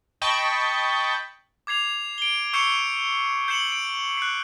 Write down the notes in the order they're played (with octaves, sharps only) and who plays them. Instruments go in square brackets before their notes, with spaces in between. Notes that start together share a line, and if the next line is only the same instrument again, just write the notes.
[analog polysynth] D#5 G5 A5 B5 C#6
[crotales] D6 G#6 C7 F7
D7 G7
C#6 E6 G6 C7 C#7 E7
G6 C7 C#7 E7 F#7
D7
F#6 C7